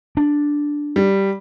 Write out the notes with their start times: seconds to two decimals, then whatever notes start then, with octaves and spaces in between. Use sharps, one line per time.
0.17 D4
0.96 G3